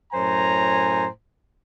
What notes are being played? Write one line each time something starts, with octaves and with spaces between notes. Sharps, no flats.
F#2 A2 C5 G#5 A#5